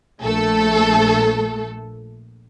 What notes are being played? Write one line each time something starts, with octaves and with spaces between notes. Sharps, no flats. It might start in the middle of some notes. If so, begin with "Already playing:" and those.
A#1 A3 A4